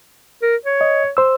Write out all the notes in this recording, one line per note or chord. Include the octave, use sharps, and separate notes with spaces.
A#4
C#5
D#5
C5 E6